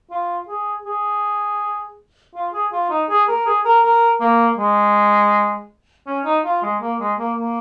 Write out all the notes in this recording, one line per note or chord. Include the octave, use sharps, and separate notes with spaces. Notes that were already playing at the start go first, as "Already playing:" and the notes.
F4
G#4
G#4
F4
G#4
F4
D#4
G#4
A#4
G#4
A#4
A#4
A#3
G#3
C#4
D#4
F4
G#3
A#3
G#3
A#3
A#3